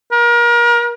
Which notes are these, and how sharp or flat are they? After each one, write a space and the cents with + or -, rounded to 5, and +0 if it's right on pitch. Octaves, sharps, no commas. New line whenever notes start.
A#4 +35